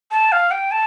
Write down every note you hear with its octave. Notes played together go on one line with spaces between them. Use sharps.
A5
F5
G5
A5